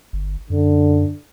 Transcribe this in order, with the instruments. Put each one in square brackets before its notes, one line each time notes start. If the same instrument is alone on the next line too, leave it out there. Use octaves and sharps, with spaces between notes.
[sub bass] G1
[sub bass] F#2 [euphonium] D3